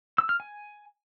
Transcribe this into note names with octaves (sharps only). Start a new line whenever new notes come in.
E6
F6
G#5